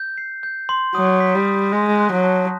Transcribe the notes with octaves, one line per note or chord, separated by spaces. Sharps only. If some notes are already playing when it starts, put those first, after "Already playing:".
Already playing: G6
C7
G6
C6
F#3 D#6
B6
G3
D#6
G#3 A#6
F#6
F#3
A5